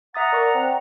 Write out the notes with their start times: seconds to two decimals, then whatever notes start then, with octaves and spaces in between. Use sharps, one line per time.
0.14 E5 F#5 A#5 D#6 A6
0.33 A#4 D5 C#6
0.55 C4